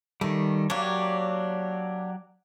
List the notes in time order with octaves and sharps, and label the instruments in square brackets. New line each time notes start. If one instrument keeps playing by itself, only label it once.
[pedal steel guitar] D#3 G3 [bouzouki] A3
[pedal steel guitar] F#3 G4 C#5 [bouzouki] A#3 D4